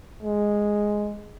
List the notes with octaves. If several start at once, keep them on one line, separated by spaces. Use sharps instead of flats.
G#3